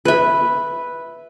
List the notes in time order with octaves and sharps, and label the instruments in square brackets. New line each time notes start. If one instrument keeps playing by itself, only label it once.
[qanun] B4 E5